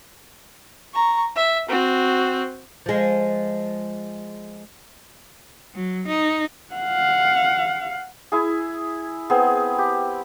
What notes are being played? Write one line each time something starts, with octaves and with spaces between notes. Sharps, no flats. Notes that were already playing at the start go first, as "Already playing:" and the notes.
A#5 C#6
E5
C4 F#4
F3 G#3
F#3
D#4
F5 F#5
E4 G#4
B3 C4 G#4
G4